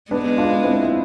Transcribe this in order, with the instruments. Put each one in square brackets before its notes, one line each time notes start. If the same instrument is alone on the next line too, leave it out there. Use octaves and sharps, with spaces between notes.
[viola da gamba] G#3 [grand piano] B3 D4
[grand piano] D4 F4
C4 E4
E4